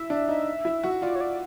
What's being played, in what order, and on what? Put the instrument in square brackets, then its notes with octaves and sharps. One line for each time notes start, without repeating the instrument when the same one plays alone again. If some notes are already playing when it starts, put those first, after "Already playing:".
Already playing: [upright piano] E4 [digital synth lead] E5
[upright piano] D4
D#4
E4
F#4
[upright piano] F4 [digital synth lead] D5
[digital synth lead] C#5
D5